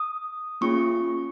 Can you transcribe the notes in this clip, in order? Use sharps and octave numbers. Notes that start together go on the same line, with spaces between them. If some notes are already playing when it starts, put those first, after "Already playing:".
Already playing: D#6
A#3 C#4 F4 G#4 C#6